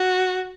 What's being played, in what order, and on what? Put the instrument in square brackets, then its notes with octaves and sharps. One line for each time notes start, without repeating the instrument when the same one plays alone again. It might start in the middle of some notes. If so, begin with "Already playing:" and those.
Already playing: [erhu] F#4